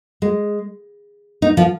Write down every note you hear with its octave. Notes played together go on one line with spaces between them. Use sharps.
G#3
D#4
F3